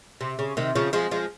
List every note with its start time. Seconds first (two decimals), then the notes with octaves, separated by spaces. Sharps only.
0.21 C3
0.39 C#3
0.57 C3 D#3
0.75 C#3 F3
0.93 F3 G#3
1.11 F3 G#3